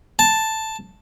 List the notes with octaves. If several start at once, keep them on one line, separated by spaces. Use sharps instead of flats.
A5